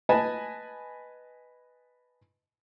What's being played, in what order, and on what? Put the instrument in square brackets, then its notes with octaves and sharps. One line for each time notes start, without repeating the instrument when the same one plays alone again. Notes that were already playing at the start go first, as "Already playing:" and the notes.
[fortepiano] B4 D#5 G#5 A5 B5